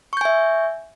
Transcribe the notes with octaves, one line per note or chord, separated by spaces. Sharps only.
E5 G#5 C#6 G6